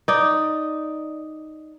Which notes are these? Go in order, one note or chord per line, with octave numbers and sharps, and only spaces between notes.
D#4 D5